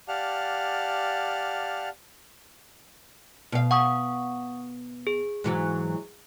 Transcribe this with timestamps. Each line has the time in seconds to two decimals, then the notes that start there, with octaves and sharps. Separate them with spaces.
0.08 G4 D5 F5 F#5 A5 F6
3.52 B2 F5
3.71 F#5 C#6 D#6
5.07 G#4
5.44 G#2 E3 F#3